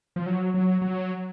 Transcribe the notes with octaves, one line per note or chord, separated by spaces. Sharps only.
F3
F#3
F#3
F#3